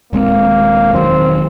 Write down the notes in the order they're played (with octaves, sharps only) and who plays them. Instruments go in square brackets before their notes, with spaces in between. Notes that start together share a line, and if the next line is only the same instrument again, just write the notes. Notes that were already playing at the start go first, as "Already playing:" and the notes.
[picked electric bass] D#1 G#3 C4 [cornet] A#3
[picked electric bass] E1 D#3 F#3 [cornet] C4